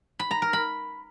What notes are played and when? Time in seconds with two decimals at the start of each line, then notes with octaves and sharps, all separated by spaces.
0.19 B5
0.31 A#5
0.42 A#4
0.53 B5